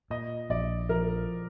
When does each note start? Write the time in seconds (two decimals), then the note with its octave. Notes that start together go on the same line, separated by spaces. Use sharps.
0.10 A#2 D#5
0.50 A#1 D5
0.89 F3 A#4